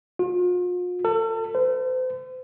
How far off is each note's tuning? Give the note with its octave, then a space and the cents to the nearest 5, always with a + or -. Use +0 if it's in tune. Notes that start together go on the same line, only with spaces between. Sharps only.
F4 +45
A4 +40
C5 -40